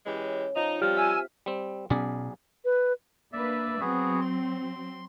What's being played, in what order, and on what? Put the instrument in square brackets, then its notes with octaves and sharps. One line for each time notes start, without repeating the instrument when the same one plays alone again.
[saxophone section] E3 G#3 G4 [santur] C#4
[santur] F3 [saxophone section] D#4
[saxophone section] F3 G3 [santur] C4 F4 [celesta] G4 F6
[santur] E5 [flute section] G#5 E6
[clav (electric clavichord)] G3 C4
[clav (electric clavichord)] B1 G#4 D5 [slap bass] B2 C#4
[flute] B4
[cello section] A#3 D4 B4 [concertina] D5 E5
[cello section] F#3 C4 [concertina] B3 F#4 G#4
[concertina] C6